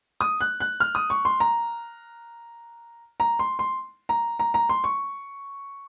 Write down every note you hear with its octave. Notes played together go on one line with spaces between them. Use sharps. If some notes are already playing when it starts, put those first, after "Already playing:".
D#6
F#6
F#6
F6
D#6
C#6
C6
A#5
A#5
C6
C6
A#5
A#5
A#5
C6
C#6